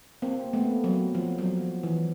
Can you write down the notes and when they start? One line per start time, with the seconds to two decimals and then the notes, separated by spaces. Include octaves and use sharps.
0.22 A#3 C4
0.53 A3 B3
0.84 F#3
1.15 F3
1.38 F#3
1.61 F3
1.83 E3